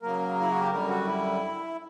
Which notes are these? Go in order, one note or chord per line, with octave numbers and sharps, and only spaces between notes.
C#3 F#3 A#3 A#4
E4
F#4
G4
F#2 D3 G3 A#4
F#4
E4